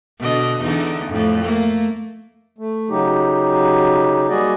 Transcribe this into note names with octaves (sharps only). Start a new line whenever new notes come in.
B2 D3 D#5
E2 D3 D#4
F2 A2
A3 A#3
A3
C#3 F#3 D#4 G4
G3 A#3 F#4 G#4 D5 D#5